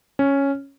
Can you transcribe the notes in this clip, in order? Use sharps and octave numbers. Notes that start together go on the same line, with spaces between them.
C#4